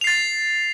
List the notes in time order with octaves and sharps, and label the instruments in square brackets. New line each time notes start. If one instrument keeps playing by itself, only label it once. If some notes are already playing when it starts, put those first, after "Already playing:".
[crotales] F7
C7
A6